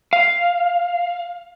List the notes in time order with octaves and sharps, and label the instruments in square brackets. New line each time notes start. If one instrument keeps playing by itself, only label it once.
[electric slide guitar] F5